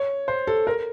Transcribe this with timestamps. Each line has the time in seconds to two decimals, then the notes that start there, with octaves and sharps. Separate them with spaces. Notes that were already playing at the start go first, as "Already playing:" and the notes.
Already playing: C#5
0.28 C5
0.47 A4
0.67 A#4